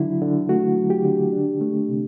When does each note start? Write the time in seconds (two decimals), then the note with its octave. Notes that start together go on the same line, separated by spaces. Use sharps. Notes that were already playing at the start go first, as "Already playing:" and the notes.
Already playing: D3 F#3 E4
0.22 D3
0.49 A3 F#4
0.76 F#3
0.90 G4
1.05 D3
1.33 D4
1.61 A3
1.89 C3